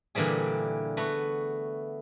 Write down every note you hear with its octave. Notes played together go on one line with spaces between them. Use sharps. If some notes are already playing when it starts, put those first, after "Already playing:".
A#2 D3 E3 G3 G#4
A3 B3 F#4